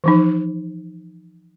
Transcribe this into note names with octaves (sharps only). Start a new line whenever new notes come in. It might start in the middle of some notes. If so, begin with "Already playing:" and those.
E3 F3 D#4